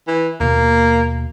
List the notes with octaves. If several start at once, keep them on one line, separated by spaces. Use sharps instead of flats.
E3
D#2 B2 A#3